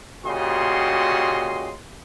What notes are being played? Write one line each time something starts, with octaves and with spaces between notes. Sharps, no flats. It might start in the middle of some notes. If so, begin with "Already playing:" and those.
A#2 C#3 F#4 G4 D#5 C6